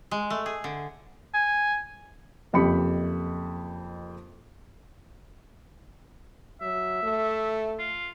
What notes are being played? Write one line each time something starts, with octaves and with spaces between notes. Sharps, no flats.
G#3
A3
G#4
D3
G#5
F#1 F2 G4 B5 C#7
F#3 E5
A3
F4